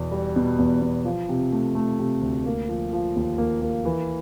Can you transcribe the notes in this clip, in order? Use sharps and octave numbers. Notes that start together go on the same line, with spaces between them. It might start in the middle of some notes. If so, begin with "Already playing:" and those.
Already playing: E2 B2
G3
B2
E2
B2
F3
C3
A3
A3
C3
D2
A#3
F3
F3
D#2
A#3
A#3
E3